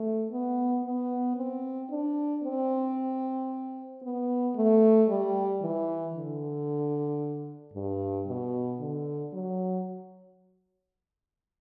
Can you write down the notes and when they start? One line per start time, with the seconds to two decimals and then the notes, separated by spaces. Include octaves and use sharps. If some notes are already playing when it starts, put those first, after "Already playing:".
Already playing: A3
0.31 B3
0.84 B3
1.37 C4
1.90 D4
2.43 C4
4.03 B3
4.55 A3
5.08 G3
5.61 E3
6.14 D3
7.74 G2
8.27 B2
8.80 D3
9.33 F#3